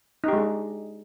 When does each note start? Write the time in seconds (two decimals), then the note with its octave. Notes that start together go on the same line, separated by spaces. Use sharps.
0.24 D#4
0.28 G4
0.33 G#3
0.37 D4